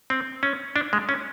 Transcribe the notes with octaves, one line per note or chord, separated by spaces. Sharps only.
C4
C#4
D4
G#3
C#4